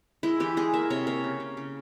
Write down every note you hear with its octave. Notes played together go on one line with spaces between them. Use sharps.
G#3 E4
E3 G4
G#3 G#4
A#3 E5
C3 C#5
A#3 C#5
C#3
C#3
C#3